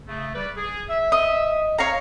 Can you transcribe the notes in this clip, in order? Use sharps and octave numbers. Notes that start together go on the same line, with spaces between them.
C#3 A3
G3 B4 D5
G#4
E5
D#5
C#5 F5 A#5